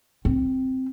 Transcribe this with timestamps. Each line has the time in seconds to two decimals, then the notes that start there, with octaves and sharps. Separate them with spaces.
0.25 C4